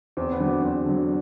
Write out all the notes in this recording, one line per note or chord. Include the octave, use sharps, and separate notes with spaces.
E2 C4
B3
D3 F#3
B3
E2 C4
D3 F#3